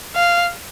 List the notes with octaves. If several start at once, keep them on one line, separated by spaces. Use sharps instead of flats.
F5